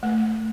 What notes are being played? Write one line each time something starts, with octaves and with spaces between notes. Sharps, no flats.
A3